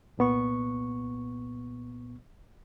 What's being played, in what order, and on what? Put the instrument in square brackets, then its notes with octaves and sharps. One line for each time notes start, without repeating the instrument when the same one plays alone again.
[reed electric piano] C2 A#2 B3 C#6